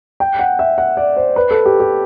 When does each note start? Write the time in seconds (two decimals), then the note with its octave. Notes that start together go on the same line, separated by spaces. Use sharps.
0.20 G5
0.39 F#5
0.59 E5
0.78 F#5
0.97 D5
1.16 C5
1.36 B4
1.51 A4
1.66 G4
1.80 G4